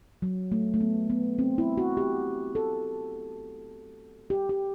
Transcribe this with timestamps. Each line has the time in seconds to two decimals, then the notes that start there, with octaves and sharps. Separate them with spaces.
0.22 F#3
0.52 A3
0.74 A3
0.81 B3
1.10 B3
1.39 C4
1.58 E4
1.78 F#4
1.97 G4
2.55 A4
4.30 G4
4.49 G4